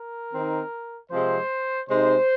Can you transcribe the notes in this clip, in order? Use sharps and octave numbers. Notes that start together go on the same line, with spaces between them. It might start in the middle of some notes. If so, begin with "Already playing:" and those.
Already playing: A#4
D#3 C4 D#4
C3 F3 G#3 C4 C5
C3 G#3 D#4 C5